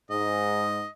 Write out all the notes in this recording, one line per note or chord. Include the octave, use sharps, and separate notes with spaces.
G#2 D#5